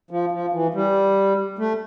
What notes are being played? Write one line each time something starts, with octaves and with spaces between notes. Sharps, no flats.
F3
F3
E3
G3
A3